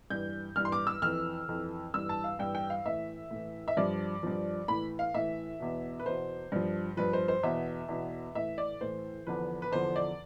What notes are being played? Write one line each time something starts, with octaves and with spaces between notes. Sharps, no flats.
G2 E3 G6
G2 E3 F6
C6
D6
E6
F2 E3 F6
F2 E3
G2 E3 E6
A5
F5
G2 E3 G5
G5
F5
A2 E3 E5
A2 E3
E5
G2 F3 D5
G2 F3
A2 E3 B5
F5
A2 E3 E5
E2 B2
B4
E2 B2 C5
G2 F3
G2 F3 B4
C5
C5
E2 B2 E5
E2 B2
A2 E3 E5
D5
A2 E3 C5
E2 D3 F3 B4
B4
E2 D3 F3 C5
D5